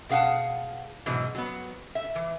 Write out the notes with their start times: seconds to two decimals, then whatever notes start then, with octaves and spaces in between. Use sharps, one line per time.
0.09 B2 G#4 F5 F#5 A5
1.06 G#2 B2 E3 F#3
1.35 F#3 B3
1.95 E5
2.15 E3